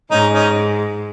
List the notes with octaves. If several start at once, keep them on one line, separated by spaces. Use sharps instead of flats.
G#2 C#4 D#4
C#4 D#4